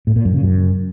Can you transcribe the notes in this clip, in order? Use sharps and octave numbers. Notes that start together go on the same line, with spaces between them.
A2
A#2
F#2
C#3
F#2